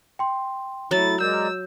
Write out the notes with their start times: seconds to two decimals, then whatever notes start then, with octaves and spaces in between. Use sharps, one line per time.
0.19 G5 C6
0.91 A2 F#3 E4 A6
1.21 G#3 A#4 D5 E6 G6